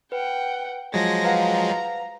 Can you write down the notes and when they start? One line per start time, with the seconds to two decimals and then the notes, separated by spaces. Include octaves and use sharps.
0.12 B4 F#5 G5
0.94 F3 F#3 G#3 G#6 A#6
1.24 B4 F5 F#5 A#5